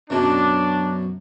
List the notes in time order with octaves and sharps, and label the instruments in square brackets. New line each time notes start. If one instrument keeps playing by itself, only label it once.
[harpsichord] F#2 B2 [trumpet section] D4